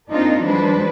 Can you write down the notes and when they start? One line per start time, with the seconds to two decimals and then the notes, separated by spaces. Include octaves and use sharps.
0.11 A#3 C4 D4 D#4 F4
0.42 E3 F#3 G#3 D4 B4 C5